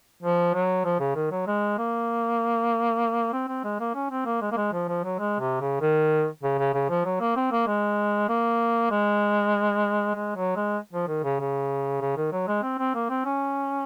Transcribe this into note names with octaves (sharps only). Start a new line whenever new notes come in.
F3
F#3
F3
C#3
D#3
F#3
G#3
A#3
C4
C4
G#3
A#3
C#4
C4
A#3
G#3
A#3
G#3
F3
F3
F#3
G#3
C3
C#3
D#3
C#3
C#3
C#3
F3
F#3
A#3
C4
A#3
G#3
A#3
G#3
G#3
F#3
G#3
F3
D#3
C#3
C#3
C#3
D#3
F#3
G#3
C4
C4
A#3
C4
C#4